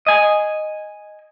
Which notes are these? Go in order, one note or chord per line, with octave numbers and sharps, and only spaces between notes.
D#5 G#5